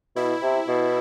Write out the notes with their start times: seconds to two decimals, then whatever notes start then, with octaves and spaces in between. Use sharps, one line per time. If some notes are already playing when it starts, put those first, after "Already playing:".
0.16 B2 E4
0.42 C3
0.68 B2